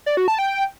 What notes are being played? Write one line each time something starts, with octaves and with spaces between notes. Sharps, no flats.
D5
F#4
A5
G5